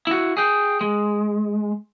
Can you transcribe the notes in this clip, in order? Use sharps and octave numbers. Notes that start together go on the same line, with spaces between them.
E4 F#4
G#4 G5
G#3